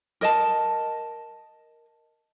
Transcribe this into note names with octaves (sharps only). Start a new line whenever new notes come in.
A#4 D#5 A5